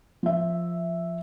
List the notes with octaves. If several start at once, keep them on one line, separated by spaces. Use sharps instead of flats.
F3 E5